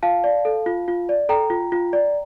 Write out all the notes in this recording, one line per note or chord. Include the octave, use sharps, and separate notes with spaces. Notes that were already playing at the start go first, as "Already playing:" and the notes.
F4 F5 A5
D5
A4
F4
F4
D5
A4 G5 A#5
F4
F4
D5